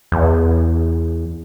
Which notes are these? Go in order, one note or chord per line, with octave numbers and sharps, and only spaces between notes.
E2